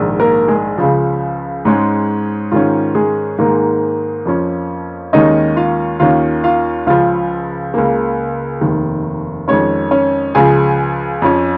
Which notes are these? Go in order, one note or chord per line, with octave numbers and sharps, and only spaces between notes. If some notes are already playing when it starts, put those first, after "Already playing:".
Already playing: A#1 G#2 D#3
A#3 A#4
G#3 G#4
C#2 C#3 F3
G#2 G#3 C#4
G#2 D#3 C#4 F4
G#3 G#4
G#2 D#3 G#3 A#3 A#4
F2 F3 C#4
D#2 D#3 G#3 C#4 D#4 D#5
F4 F5
D#2 D#3 C#4 F4 F5
F4 F5
C#2 C#3 F3 F4 F5
C#2 C#3 A#3
F1 D#2 D#3
F2 D#3 G#3 C#4 C#5
C#4 C#5
C#2 C#3 F3 G#4 G#5
F2 F3 C#4